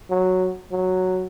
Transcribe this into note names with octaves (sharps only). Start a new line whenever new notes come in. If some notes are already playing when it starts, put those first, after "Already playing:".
F#3
F#3